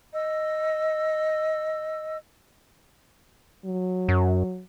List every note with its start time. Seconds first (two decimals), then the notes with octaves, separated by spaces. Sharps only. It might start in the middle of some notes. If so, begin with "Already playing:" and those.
0.14 D#5 E6
3.65 F#3
4.09 F#2